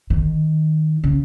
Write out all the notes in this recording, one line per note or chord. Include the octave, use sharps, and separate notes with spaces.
D#3
C#3